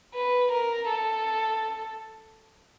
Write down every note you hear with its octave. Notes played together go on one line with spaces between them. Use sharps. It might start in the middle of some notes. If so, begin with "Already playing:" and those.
B4
A#4
A4